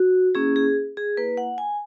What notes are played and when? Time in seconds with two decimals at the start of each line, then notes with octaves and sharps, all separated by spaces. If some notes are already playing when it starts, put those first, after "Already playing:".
Already playing: F#4
0.35 A#3 C#4 E4 G#4
0.56 G#4
0.97 G#4
1.17 A#3 E4 B4
1.37 F#5
1.58 G#5